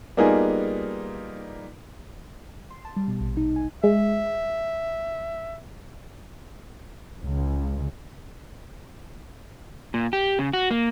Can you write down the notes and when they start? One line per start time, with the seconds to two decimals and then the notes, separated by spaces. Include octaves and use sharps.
0.17 G3 A#3 B3 D#4 F4 G#4
2.71 C6
2.85 A5
2.97 G3
3.08 B2
3.20 A#1
3.37 D#4
3.56 G#5
3.84 G#3 E5
7.23 C#2
9.94 A#2
10.13 G4
10.39 C#3
10.53 F#4
10.71 A#3